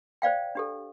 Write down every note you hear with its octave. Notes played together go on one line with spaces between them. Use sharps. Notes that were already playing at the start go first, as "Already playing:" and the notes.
C5 D5 F5 G5
D4 G4 A4